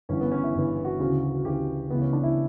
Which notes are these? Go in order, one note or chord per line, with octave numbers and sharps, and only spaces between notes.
G1 G2 E3 C#4
B3
C#4
E4
G1 G2 E3
F#4
D2 C#3 E3
D2 C#3 E3 G4
C#2 C#3 E3 B3
C#4
D4
E4